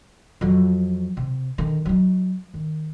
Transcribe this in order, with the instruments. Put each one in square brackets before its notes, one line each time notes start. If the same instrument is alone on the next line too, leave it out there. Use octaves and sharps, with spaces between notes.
[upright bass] F2 F#3
C3
D3 D#3
F#3 D#4
D#3